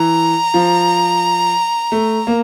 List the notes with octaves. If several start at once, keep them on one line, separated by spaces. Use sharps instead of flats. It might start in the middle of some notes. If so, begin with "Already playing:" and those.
Already playing: E3 A#5
F3
A3
A#3